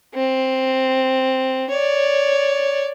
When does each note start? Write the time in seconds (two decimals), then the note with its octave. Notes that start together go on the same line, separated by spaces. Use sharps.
0.15 C4
1.70 C#5 D5